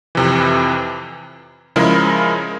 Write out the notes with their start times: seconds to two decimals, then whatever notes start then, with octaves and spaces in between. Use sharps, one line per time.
0.15 F2 C3 E3
1.76 C#3 F3 G#3 E4 A#4